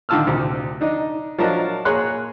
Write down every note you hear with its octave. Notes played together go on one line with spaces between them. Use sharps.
D3 D#3 F4 A5 E6 F6
D2 C3
D4 D#4 D#5
F3 F#3 D4 A#4 D#5 A5
A#3 G#4 A#4 C#5 C6 F#6